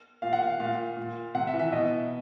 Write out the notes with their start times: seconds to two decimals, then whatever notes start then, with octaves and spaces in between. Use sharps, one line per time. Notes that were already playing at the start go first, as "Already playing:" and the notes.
0.22 A#2 F5
0.33 F#5
0.43 F5
0.60 A#2 F5
0.97 A#2
1.35 C3 F#5
1.47 E5
1.53 E3
1.59 E5
1.72 B2 D#5